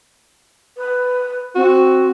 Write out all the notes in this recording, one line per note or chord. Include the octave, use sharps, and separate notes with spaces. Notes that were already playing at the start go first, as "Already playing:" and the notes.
B4
C4 F#4